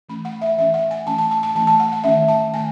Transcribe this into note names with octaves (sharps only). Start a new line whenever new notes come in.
E3 A3 C#4 B5
F#5
E5
E3 A3 C#4 E5
F#5
G#5
E3 A3 C#4 A5
A5
A5
A5
E3 A3 C#4 A5
A5
F#5
F#5
D#3 A3 C#4 E5
A5
D#3 A3 G#5